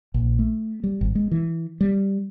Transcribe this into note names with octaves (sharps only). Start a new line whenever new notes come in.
A#1
A3
G3
G#1
G#3
E3
G3